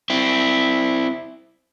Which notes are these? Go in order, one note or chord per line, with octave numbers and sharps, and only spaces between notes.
C4 E4